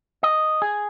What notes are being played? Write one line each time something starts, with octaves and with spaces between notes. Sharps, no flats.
D#5
G#4